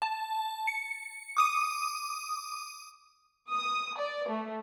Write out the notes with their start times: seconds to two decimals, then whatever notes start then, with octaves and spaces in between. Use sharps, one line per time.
0.02 A5
0.67 C#7
1.37 D6 D#6 D#7
3.51 D#6
3.99 D5
4.29 A3